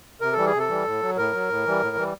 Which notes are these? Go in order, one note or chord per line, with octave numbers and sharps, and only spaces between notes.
C3 A#4
E3 G3 A4
G#4
C3
A4
E3 G3
A2
F#3
A2 A#4
F#3
A2
E3 G3
A2
E3 G3